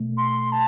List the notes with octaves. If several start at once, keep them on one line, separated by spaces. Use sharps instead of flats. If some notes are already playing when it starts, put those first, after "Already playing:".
Already playing: B2 A3
C6
A5